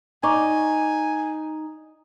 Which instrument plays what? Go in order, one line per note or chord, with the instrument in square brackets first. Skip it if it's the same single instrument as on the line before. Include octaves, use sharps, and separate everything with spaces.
[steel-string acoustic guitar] D#4 [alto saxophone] G#5 [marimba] A#5 C#6 D6